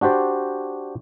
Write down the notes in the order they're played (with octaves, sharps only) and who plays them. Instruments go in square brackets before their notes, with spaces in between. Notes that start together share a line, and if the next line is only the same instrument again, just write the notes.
[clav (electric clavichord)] D4 F#4 G4 C5 D5